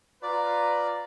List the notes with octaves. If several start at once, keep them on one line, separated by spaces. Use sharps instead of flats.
F4 B4 D5 A#5